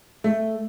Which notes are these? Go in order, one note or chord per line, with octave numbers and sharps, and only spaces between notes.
A3